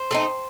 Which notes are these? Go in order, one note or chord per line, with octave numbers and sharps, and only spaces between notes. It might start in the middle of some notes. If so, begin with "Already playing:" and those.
Already playing: C5
A3 C4 D#4